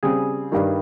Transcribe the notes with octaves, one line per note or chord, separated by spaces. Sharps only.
C#3 G3 C4 G#4
G2 D#3 G3